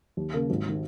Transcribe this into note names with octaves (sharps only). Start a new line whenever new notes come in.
D#2
C#3 A#3
G#1
D#3